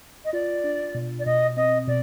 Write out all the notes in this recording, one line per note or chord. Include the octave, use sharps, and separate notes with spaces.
D#5
F4 D5
D4
B2
D5
B2 D#5
C4 D#5
B2 D5